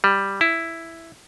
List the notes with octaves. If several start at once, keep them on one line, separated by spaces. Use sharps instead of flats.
G3
E4